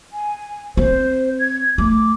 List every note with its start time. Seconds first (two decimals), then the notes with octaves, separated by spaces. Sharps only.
0.13 G#5
0.77 C4 C5
1.40 G#6
1.78 A3 D6